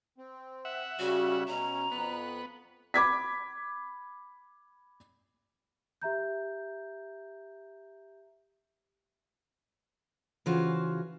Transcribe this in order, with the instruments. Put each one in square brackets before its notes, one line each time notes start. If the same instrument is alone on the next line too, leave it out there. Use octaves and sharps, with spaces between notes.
[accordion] C4
[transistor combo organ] E5 F#5
[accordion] C#3 G3 C#4 [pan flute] F#4
[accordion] B2 C#4 [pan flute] A#5
[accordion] F2 F#6 [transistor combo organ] B3
[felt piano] B5 D6 G#6 B6
[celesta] G4 E5 A#5 G6
[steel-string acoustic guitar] C#3 E3 F4 F#4 G#4 C5